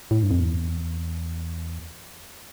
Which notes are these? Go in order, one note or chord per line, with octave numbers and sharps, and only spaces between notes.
A2
G2
F2
E2